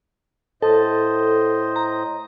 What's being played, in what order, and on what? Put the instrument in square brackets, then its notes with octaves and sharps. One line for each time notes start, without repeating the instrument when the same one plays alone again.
[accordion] A2 C5 D#5 [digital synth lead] A4
[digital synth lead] A#5